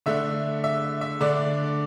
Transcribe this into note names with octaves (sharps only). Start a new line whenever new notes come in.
D3 A3 D4 E5
E5
E5
D3 A3 D4 D5